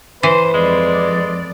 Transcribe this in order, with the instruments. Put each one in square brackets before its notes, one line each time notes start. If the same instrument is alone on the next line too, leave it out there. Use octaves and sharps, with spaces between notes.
[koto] E3 [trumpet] B4 [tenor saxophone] C5
[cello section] F2 D5 [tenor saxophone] G#3